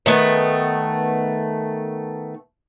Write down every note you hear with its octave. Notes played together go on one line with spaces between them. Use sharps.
D#3 A3 B3